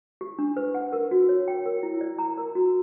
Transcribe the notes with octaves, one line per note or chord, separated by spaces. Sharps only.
G4
D4
B4
F#5
A#4
F#4
C#5
G5
A#4
E4
D5
A#5
A#4
F#4